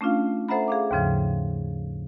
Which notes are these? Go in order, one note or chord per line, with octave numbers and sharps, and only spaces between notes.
A3 C#4 D4 F4 F5
A4 C5 E5 F#5 A#5 B5
G#4 F5 D6
D#2 G#2 C#3 F3